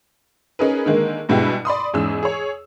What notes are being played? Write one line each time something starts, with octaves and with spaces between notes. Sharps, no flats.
C#4 D#4 G#4 A#4 B4
D3 D#3 G#3 A#3
G2 B2 G#3 B3 E4 G4
D5 B5 C6 D#6
E2 G#2 C#4 G#4 E6
G#4 C#5